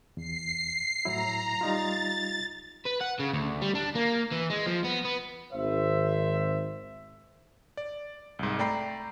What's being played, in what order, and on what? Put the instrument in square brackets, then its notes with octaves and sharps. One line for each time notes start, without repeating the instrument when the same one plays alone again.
[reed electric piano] E2 [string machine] C7
[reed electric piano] A2 F#3 E4 [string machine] A#5
[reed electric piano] G3 D#4 F4 [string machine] A6
[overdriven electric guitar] B4
F#5
C#3
D2
G3
D4
A#3
E3
G#3
F3
B3
B3
[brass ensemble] G#1 C5 E5
[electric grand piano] D5
C2 G#2
A3 D5 G5 A#5 B5 C7